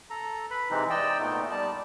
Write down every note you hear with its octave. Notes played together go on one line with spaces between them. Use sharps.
A4 A#5
B4 B5
C3 E3 G#3 C4 D#4
D5 D#5 G5 E6
A#2 A3 B3 D#4
G3 D5 A5